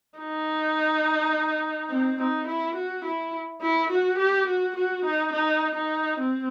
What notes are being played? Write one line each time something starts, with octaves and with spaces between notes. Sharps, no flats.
D#4
C4
D#4
E4
F#4
E4
E4
F#4
G4
F#4
F#4
D#4
D#4
D#4
C4